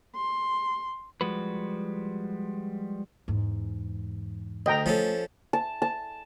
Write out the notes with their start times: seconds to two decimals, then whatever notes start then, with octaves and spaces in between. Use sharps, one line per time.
0.16 C6
1.21 F3 G3 G#3 F#4 B4
3.28 E2 G#2
4.66 D2 D#5 G5 A#5
4.86 F3 A3 C#4 A4
5.53 A5
5.82 A5